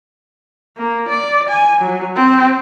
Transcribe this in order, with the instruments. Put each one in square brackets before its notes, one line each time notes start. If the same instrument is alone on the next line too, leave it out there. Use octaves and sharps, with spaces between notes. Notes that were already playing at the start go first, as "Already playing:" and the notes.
[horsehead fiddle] A#3
D5
G#5
F#3
C4